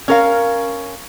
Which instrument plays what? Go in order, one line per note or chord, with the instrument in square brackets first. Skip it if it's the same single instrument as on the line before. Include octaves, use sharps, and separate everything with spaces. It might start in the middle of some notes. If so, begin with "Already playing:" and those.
[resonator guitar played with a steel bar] C#4 A#4 F5